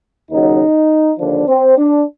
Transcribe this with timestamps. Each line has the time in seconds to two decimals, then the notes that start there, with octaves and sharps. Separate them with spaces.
0.30 D#2 C#3 F#3 D#4
1.19 D#2 D3 F3 D4
1.47 C4
1.77 D4